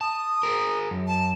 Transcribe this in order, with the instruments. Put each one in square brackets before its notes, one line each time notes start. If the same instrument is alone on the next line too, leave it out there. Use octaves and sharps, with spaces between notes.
[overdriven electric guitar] A5 [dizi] D#6
[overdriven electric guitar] G#4 A#4
F#2
[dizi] A5